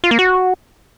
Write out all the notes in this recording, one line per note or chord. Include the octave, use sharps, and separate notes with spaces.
F4
A#3
F#4